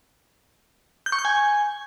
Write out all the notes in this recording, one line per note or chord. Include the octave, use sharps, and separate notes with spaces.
G6
C#6
G6
G#5